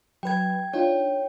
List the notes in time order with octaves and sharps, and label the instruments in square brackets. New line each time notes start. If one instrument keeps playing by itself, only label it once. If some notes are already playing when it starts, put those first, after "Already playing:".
[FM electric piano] F#3 B4 [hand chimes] G5 G#6
[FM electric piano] D4 D#4 F4 [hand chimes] C#5 G5